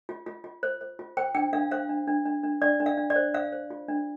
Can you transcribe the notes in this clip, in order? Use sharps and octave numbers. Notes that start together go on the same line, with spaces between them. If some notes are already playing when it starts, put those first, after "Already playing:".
F4
F4
F4
C5
C5
F4
C5 G5
D4 G5
D4 F5
C5 F5
D4
D4
D4
D4
D4 D5
D4
F5
D4
D5
C5
C5 F5
C5
F4
D4